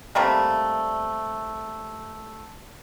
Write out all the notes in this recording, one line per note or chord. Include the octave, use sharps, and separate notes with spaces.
C3 G3 A3 A#3